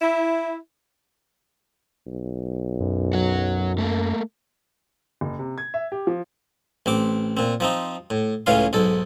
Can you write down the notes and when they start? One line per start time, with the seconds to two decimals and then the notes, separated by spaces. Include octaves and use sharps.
0.01 E4
2.07 B1
2.80 F#2
3.13 F#3 F#4
3.79 A3 A#3
5.21 F#1
5.39 C3
5.58 G#6
5.74 E5
5.92 G4
6.07 F3
6.86 A1 C4 D6
7.37 A#2 C4
7.60 F3 C4 D#4
8.10 A2
8.46 C#2 A2 E3 C#4 F5 C6
8.73 B1 G#2 A4